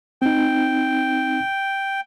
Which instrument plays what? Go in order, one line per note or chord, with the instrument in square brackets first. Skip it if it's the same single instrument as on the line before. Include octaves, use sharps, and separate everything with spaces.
[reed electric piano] C4 D#4 [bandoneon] G5